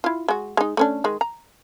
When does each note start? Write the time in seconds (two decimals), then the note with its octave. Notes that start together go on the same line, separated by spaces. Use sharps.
0.04 E4 F4
0.28 G#3 F#4
0.57 G#3 D#4
0.77 A3 C#4 D4
1.04 D#3 G#3
1.21 A#5